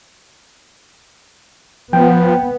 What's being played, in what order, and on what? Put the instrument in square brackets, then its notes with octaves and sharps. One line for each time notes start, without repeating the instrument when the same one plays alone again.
[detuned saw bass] F3 [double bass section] B3 [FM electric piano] G5